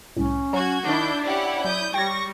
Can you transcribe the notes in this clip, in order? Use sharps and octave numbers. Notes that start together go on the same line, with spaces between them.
C2 A2 C#4
F#3 F#4 G#6
D#3 D4 E4 G6
C#4 E4 G4 D5 F#5
F#3 D#6 G6
G3 C#5 G5 C#6 A#6